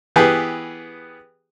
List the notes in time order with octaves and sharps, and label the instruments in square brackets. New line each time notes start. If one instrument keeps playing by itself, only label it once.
[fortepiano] E3 B3 G4 G#4 B4